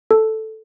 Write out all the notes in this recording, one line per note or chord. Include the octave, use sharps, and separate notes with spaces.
A4